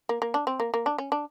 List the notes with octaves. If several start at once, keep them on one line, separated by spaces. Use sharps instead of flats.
A#3
A#3
D4
C4
A#3
A#3
D4
C#4
D4